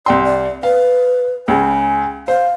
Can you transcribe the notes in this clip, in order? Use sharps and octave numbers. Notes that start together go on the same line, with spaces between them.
C2 D5 G5 C6
D5
B4 F5
C#2 C#3 G#5
C5 F5